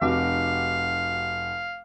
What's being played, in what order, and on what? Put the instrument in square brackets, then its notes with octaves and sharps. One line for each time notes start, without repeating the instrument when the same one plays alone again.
[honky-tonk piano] F1 F#4 D6 [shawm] F5